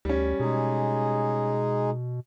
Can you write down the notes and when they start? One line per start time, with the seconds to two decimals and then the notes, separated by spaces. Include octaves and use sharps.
0.05 D2 G3 C#4
0.40 B2 G#3 D#4 G#4